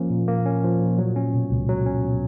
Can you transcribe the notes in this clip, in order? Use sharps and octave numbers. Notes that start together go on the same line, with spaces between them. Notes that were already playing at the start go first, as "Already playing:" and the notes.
Already playing: F3 A#3 C#4
A#2
A#3
C#4
F3
A#2
F#3
C#4
B2
C#2
F#3
C#4
B2